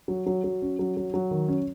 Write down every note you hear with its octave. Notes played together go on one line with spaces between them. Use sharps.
F#3
F#3
F#3
C#4
F#3
F#3
F#3
D#3
C#4